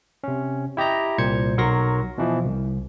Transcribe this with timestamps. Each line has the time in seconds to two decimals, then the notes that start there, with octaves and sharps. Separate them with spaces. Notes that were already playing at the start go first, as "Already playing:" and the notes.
0.24 C3 C#4
0.77 E4 G4 D#5 A#5
1.18 C2 A#2 C5 G#6 C#7
1.58 B1 F#3 A#4 C6 C#6 A#6
2.18 B2 E3 F3
2.44 C2